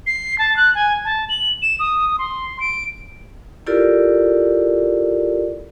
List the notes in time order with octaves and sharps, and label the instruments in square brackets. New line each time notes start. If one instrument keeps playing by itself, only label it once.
[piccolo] C7
A5
F#6
G#5
A5
F#7
E7
D#6
C6
D7
[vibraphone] E4 F4 G4 A4 A#4 D5